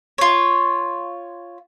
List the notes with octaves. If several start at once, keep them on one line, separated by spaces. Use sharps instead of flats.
F4 C#5